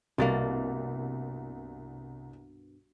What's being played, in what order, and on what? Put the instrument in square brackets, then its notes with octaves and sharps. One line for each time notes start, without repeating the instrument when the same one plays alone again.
[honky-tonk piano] C2 A6 [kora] G2 B2 A#3